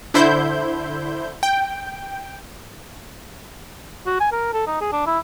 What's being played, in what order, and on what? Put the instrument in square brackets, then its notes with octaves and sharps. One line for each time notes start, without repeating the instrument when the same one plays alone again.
[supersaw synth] D3 E4 C5 G6
G5
[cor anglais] F#4
G#5
A#4
A4
D#4
G#4
D4
E4